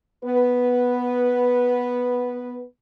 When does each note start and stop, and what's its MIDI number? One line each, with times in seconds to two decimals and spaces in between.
0.24 2.64 59
0.24 2.64 71